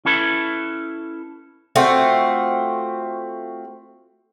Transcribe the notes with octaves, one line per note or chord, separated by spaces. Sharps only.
C#4 E4 A4 B4
A3 C4 F4 F#4